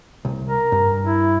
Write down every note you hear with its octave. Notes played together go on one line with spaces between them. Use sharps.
C2
A#4
G2
E4